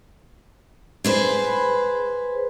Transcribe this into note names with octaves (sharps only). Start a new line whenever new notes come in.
G#4 B4 C5